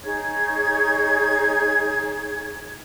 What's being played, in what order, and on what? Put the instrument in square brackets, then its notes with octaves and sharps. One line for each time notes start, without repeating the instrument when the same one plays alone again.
[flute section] D#4 G#4 C#5 G#6